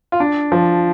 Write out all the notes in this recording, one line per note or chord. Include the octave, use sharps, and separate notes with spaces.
F4
D4
F3